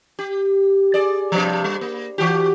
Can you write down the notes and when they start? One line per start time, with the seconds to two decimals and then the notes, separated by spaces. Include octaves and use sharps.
0.19 G4
0.94 G#4 D5
1.32 G2 C3 F3
1.64 G3
1.81 A#3
2.18 E3 F#4 G4